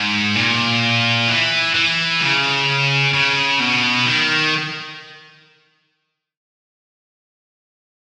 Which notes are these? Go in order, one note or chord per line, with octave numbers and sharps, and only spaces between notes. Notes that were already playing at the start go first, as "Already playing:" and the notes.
Already playing: G#2
A#2
E3
E3
C#3
C#3
B2
D#3